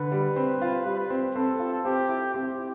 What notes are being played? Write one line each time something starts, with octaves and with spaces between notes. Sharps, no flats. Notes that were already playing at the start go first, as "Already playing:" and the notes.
Already playing: D3 B4
G3
C4
F4
G3
C4
C4 A4
F4
C4 G4
E4
C4 G4
E4